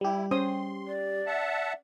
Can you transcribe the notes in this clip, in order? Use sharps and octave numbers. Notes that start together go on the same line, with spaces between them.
G3 E4 G4
C#4 C5 C6 D#6
D5
E5 F#5 A5